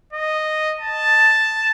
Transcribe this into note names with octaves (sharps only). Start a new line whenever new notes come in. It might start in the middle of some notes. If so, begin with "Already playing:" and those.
D#5
A5